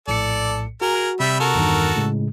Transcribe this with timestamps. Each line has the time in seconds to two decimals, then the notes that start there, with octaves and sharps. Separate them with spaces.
0.08 A#1 A2 A4 D5 C#7
0.81 F#4 G#4 A#4
1.20 C3 G3 E5 B5
1.40 F#4 A4 A#4
1.55 E2 G2 D#3
1.95 A2 C#3 G#3